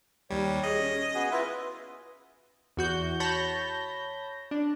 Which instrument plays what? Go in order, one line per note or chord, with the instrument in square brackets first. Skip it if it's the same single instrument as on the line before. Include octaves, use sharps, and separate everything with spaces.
[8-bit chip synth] D#2 G3 [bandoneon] C#5
[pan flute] G#4 [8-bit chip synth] D#5
[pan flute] C#4
[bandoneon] B3 F#4 G#4
[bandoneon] E4 F4 E5 [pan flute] B4
[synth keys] E2 F#4 G6
C#5 A5 B5 G6 A#6
D4